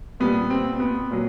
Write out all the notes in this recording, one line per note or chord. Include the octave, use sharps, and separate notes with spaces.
A#2 G3 B3
C4
B3
A#2 F#3